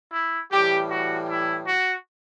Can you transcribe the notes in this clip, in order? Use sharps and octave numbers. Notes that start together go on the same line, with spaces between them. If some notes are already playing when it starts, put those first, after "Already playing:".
E4
A2 E3 G3 G4
F#4
E4
F#4